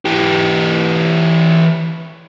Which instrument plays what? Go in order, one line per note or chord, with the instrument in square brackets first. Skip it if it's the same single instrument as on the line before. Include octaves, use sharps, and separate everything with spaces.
[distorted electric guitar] E3 G4